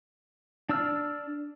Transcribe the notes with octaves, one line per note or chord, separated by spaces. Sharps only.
D4 D5 E6 F6